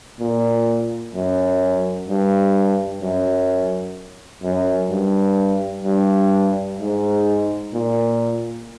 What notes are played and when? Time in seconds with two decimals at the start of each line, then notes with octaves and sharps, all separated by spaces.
0.20 A#2
1.14 F#2
2.09 G2
3.02 F#2
4.43 F#2
4.90 G2
5.84 G2
6.79 G#2
7.74 A#2